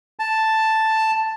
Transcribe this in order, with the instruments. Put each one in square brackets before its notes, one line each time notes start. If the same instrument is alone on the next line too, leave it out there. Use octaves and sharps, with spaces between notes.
[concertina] A5